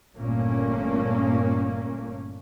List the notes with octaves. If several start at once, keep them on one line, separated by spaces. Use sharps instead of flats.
G1 A#2 A3 A#3 C#4